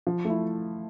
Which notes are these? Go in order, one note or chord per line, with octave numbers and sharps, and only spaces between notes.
F3
A3 E4